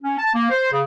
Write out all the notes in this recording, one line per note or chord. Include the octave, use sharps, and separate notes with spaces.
C#4
A5
A#3
C5
C#3